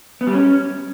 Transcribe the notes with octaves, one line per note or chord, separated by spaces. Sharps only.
B3
G3
C#4